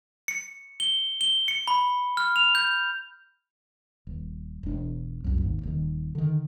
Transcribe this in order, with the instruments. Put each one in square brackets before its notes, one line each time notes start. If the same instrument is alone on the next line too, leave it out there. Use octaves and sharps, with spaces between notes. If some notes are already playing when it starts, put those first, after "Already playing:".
[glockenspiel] C#7
G7
G7
C#7
B5
F6
F7
G6
[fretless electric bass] D#1
E1 D4
C2 F#2
G#1 D#2
D#1 D#3
D3 D#3